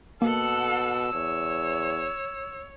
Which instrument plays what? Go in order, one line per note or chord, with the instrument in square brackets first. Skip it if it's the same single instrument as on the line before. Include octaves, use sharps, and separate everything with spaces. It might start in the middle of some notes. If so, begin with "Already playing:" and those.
[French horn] B2 [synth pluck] A#3 [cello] A4 F#5 [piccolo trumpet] E6
[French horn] E2 [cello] C#5